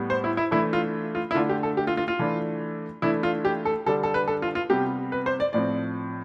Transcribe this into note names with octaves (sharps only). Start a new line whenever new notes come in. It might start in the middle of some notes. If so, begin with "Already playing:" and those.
Already playing: A2 G3 B3
C5
E4
E4
E3 A3 D4 E4
F4
F4
E4
D3 A3 D4 F4
G4
A4
G4
F4
F4
F4
E3 A3 D4
E3 A3 D4 E4
F4
G4
A4
D3 G3 D4 A4
A4
B4
A4
F4
F4
C3 G3 B3 G4
B4
C5
D5
A2 F3 C4 D5